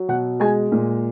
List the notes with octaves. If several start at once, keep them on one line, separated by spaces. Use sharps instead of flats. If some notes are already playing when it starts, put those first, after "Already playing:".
Already playing: F#3
B2 F#5
G#3 G#5
A#2